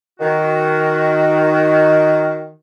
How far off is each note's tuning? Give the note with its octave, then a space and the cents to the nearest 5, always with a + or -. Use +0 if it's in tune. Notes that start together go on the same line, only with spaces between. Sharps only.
D#3 +0 F#4 +0